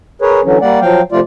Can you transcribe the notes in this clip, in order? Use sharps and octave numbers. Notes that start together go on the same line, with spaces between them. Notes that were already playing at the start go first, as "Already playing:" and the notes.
G#4 A#4 B4 C#5
D3 E3 F#3 C#4
G3 A#3 D5 F#5
F3 F#3 F5 G5
C3 F3 A3 F4 D5